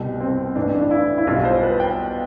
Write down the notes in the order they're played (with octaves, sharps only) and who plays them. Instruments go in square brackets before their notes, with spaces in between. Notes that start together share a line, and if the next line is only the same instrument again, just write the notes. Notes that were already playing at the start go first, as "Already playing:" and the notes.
Already playing: [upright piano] C2 B2 G3
C4
A1 A2 E3 D4
D4
E4
E4
B1 B2 G3 F4
C5
B4
G5